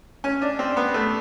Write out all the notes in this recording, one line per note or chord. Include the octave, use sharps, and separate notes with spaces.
C#4
D4
C4
B3
A3